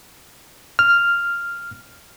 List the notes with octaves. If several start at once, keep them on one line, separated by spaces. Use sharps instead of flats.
F6